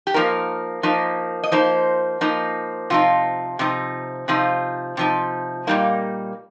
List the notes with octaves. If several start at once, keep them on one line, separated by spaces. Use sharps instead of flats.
G4
F3 A#3 D#4 A#4
F3 A#3 D#4
D#5
F3 A#3 D#4 C5
F3 A#3 D#4
C3 F3 D#4 F4
C3 F3 D#4
C3 F3 D#4 F4
C3 F3 D#4
A#2 G3 A#3 D#4